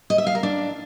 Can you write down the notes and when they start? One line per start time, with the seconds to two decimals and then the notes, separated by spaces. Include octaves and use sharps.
0.10 D#5
0.18 E5
0.27 F5
0.35 A#4
0.43 D4